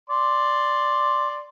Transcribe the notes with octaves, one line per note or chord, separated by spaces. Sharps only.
D5 C6